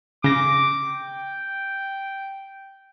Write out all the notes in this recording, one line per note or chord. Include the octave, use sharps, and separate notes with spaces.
C#3 D6 A#6
G5